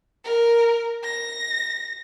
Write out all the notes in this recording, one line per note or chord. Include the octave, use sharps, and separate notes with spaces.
A#4
A#6